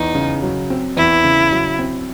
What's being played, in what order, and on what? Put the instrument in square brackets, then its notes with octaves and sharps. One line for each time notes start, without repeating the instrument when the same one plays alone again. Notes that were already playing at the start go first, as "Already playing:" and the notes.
Already playing: [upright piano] E2 [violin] D#4
[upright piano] C#3
F#3
C4
[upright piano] E2 [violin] E4
[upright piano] C#3
F#3
C4